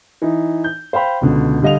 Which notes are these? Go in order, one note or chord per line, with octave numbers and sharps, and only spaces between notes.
E3 D#4
G6
C5 F5 G5 B5
C#2 B2 D3
D3 G3 D#5 F5 F7